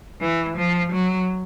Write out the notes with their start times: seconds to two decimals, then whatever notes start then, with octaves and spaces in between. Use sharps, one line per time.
0.21 E3
0.57 F3
0.92 F#3